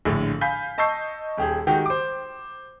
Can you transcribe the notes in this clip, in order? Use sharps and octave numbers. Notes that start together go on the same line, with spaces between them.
A#1 A2 D3
F5 G#5 B5 G6 B6
D#5 A5 C#6 E6 G6 C7
D#1 G4 G#4
D#3 G#3 F#4 G4
C5 D6